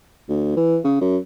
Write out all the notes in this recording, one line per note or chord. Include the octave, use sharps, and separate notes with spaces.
D2
E3
C#3
F#2